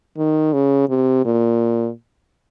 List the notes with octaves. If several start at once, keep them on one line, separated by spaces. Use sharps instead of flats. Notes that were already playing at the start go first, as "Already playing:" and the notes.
D#3
C#3
C3
A#2